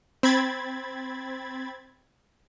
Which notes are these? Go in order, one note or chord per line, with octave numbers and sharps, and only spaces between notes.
C4 B5 G#6 A6